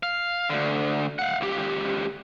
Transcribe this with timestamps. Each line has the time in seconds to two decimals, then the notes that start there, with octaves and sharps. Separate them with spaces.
0.03 F5
0.50 D2 D3
1.19 F5 F#5
1.41 C#2 G4